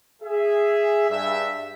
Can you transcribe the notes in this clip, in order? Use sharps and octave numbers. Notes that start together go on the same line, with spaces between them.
G#4 E5
G2 E5